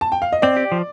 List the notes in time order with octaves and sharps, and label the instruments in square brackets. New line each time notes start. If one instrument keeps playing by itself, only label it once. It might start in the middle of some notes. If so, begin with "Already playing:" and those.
[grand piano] A5
G5
F5
D#5
[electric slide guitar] C4 [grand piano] D5
[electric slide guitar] G4
F3